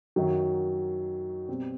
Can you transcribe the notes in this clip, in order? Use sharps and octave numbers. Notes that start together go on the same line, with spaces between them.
F#2 D#3 F#3
B2 G3 C4